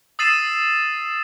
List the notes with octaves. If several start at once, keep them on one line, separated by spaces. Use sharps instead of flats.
D#6 E6 A6 C7 D#7 E7